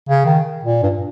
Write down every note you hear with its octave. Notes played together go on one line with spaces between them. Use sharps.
C#3
D#3
A#2
G2